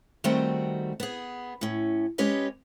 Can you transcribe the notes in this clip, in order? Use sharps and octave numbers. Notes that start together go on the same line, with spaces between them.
D#3 G3 A3 C4 F#4
B3 G#4
A2 C#4
G#3 C#4 G4 B4 C#5 D#5